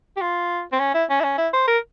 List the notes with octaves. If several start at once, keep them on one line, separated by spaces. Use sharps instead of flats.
G4
F4
C4
C#4
E4
C#4
E4
C#4
E4
C5
A#4